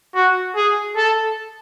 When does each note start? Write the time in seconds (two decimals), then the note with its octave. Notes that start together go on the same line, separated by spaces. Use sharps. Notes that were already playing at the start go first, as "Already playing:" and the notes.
0.15 F#4
0.56 G#4
0.97 A4